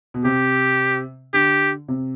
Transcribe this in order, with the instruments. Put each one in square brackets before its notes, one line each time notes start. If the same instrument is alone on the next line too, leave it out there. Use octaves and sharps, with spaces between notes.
[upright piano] B2
[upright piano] C3 [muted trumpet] G4
[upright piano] D3 [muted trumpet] G4
[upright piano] C3